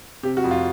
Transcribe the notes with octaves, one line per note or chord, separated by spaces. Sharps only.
C3 G4
F#4
F2
F4